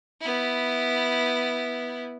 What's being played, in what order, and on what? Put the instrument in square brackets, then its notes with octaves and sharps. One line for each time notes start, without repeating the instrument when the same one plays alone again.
[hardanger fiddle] B3 E4